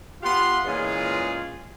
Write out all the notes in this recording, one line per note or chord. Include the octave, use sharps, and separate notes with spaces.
B3 F4 G4 F5 F#5 C6
A#2 E3 G#3 C#4 F4 G#4